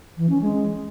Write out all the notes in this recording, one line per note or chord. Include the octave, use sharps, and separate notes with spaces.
E3
C#4
G#3